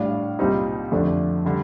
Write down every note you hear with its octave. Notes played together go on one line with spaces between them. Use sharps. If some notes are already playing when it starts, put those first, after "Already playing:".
Already playing: A2 G3 D4 F5
C2 A#2 G3 C4 D#4
F2 D3 A3 D4
D3 G3